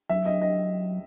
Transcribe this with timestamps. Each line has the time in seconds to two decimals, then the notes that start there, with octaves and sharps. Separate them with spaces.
0.09 F#3 E5
0.26 D#5
0.42 D#5